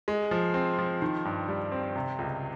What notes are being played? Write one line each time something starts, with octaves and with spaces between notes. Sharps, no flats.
G#3
F3
C4
F3
D#3
G2
G3
C4
C3
C#2